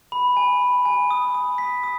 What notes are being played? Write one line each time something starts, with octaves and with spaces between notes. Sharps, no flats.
B5
G#5
B5
G#5
D#6
D#6
B6
D#6